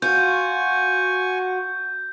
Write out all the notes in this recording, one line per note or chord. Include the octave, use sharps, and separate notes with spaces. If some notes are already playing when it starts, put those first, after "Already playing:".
F4 F#4 G#5 C#6 G6